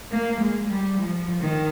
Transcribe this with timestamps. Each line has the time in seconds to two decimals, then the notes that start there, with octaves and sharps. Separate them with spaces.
0.11 A#3
0.40 G#3
0.69 G3
0.98 F3
1.41 D#3